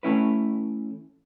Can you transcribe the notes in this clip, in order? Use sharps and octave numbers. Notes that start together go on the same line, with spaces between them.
E3 A3 C#4 E4 B4